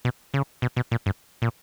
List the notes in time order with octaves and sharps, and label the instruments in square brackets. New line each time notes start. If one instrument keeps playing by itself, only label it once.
[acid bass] B2
C#3
B2
B2
A#2
G2
A#2